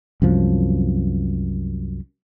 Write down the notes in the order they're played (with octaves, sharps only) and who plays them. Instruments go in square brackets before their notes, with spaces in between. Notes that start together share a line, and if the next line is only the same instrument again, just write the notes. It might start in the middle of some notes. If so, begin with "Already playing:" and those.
[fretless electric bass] C2 F#2 F3